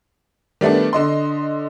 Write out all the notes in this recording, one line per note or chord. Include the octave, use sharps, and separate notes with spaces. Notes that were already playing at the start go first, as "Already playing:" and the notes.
D#3 G3 A3 B3 D4
D3 D#5 C6